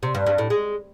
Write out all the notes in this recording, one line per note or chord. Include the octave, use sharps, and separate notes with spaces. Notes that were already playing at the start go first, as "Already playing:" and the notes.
C3
G2
G2
A2
G#3